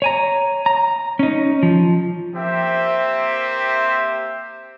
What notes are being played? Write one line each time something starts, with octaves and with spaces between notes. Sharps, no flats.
C#5 G#5 A#5
A#5
C#4 D#4
F3
A#3 C4 G4 E5